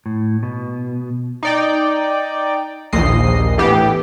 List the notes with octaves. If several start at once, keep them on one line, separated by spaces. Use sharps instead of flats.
A2
B2
D#4 D5 G5
A#1 D#2 D#5 C7
A2 E3 B3 G4